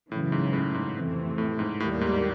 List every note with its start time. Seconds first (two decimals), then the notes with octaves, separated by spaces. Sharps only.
0.11 F#2 A2 C#3 E3
0.32 G#2
0.53 A2
0.74 G#2
0.95 F2 C3 E3 A3 C4
1.38 A2
1.59 G#2
1.80 D#2 A2 D#3 G3 A#3
2.01 G#2